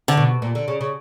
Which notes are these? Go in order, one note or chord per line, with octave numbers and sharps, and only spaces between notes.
D3
B2
A#2
D3
C#3
C#3